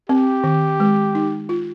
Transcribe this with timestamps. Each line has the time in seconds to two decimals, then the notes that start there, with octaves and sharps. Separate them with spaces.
0.09 C4 G4
0.44 D#3
0.80 G#3
1.15 D#4
1.49 F4